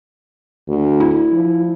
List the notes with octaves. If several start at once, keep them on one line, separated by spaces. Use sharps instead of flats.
D2
E4
F3